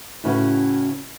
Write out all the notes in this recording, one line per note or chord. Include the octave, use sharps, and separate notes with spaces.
A2 C#3 C#4 E4 F#4 B4